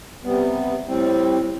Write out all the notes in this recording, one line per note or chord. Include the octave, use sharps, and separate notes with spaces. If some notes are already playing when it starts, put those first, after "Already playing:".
C3 G3 B3
A2 G3 C4